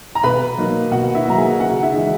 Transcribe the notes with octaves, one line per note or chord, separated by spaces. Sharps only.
A#5
B2 B4 B5
F#3 A#3 D#4
B2 F#4 F#5
E4 E5
F#3 A#3 D#4 A#5
G#4 G#5
C#3 F#4 F#5
E4 E5
E3 G#3 D#4